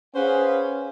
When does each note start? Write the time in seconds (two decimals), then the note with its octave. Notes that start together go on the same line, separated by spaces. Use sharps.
0.15 C#4 G#4 B4 C5 F5 F#5